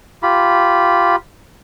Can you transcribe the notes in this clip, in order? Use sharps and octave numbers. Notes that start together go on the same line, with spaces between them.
F4 G4 B5